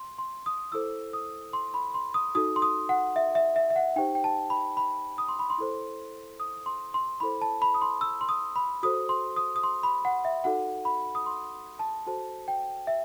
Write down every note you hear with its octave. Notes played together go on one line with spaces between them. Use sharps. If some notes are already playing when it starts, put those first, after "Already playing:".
Already playing: C6
C6
D#6
E4 A4 C5 E6
D#6
C6
B5
C6
D#6
D#4 F#4 A4 D#6
C6
D#6
F#5
E5
E5
E5
E5
F#5
D#4 G4 C5 G5
G5
A5
B5
B5
D#6
C6
B5
C6
E4 A4 C5
D#6
C6
C6
E4 A4 C5 B5
A5
B5
D#6
C6
E6
C6
D#6
B5
F#4 A4 C5 D#6
C6
D#6
D#6
C6
B5
F#5
E5
D#4 F#4 A4 F#5
B5
D#6
C6
A5
F#4 A4 C5 A5
G5
E5